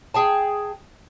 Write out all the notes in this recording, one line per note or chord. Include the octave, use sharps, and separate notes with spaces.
G#4 G5 A5